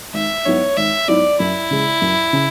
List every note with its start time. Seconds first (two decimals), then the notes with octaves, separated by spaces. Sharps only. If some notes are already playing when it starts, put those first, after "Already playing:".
0.14 G#1 E5
0.46 G#2 F#3 B3 E4 C#5
0.77 G#1 E5
1.08 G#2 F#3 B3 E4 D5
1.40 F#2 E4
1.71 C#3 G#3
2.02 F#2
2.33 C#3